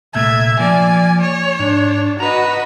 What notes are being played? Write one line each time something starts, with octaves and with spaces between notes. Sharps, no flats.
C2 A#2 A3 E5 G#6
F3 A#3 D5 G#5
C#5
G#2 D4
F#4 B4 D#5 A#5